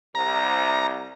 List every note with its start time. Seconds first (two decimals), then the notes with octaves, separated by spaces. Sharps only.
0.15 C2 A#5